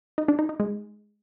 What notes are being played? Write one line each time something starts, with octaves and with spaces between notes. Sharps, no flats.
D#4
D4
D#4
D#4
G#3